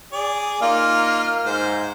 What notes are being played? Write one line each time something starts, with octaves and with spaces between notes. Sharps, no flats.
G#4 D5
A#3 D#4 F4 F6
G#2 C5